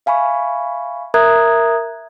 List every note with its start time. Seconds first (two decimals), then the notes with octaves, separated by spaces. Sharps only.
0.06 E5 F5 G#5 B5 C#6
1.14 A#4 E5 A#5 D#6 F#6 G#6